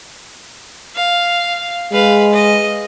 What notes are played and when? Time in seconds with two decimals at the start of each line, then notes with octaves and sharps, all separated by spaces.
0.95 F5
1.92 G#3 B4 F5
2.33 D#5